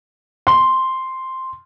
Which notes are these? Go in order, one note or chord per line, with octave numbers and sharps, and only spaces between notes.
C6